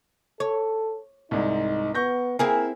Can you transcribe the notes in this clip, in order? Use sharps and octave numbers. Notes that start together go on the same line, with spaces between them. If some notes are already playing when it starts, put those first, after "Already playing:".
A4 C#5
C2 G#2 D#4
B3 C#6 G6 A#6
A#3 C4 E4 G#4 A#4